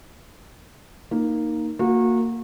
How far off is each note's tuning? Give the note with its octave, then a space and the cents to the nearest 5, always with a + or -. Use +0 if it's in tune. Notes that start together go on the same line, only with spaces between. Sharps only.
A#3 +0 D#4 +0
A#3 -15 F#4 -30